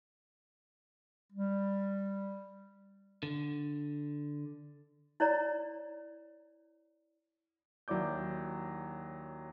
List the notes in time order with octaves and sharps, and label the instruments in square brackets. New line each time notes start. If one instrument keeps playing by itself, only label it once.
[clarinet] G3
[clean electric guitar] D3
[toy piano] E4 C#5 D5 A#5
[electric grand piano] D#2 F#3 E4 D5 D6 G6